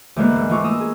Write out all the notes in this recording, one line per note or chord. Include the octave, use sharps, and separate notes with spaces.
D2 E3 G#3 A#3 B3 F#6
G#2
E3 A3 E4 F4 C#6 D6
A#4 D#6 E6
G#4